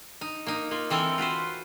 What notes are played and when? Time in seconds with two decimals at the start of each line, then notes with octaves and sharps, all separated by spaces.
0.21 D#4
0.47 A#3 D#4
0.71 A#3 F4
0.90 E3 C4 A4 A#4
1.18 F4 F#4 B4 C5